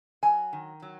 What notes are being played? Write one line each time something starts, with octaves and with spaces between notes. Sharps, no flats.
F#3 G#5
D#3
F#3